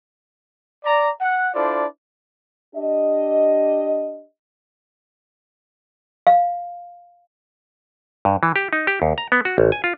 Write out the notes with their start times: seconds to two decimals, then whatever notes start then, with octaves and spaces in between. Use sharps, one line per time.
0.85 D5 A#5
1.21 F#5
1.54 D4 E4 F4 A4 C5 D5
2.76 D4 G4 D#5
6.27 F5
8.25 G2
8.43 E3
8.56 G4
8.73 D#4
8.87 G4
9.02 D#2
9.18 A#5
9.32 B3
9.45 F#4
9.58 A1
9.72 G#5
9.84 F4